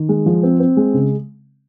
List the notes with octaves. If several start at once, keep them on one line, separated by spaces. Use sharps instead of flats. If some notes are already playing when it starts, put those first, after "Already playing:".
Already playing: D#3
G#3
F3
C4
C4
G#3
C#3